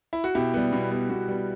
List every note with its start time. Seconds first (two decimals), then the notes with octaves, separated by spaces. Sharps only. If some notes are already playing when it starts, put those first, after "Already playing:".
0.13 E4
0.24 F#4
0.35 B2 E4 G4
0.54 G3 B3
0.73 B2
0.91 G3 B3
1.10 B2 F#4
1.28 G3 B3